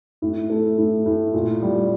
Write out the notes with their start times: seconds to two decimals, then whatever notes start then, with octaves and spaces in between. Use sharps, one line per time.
0.22 A2
0.50 A3
0.78 A2
1.06 A2
1.34 A#2
1.62 G3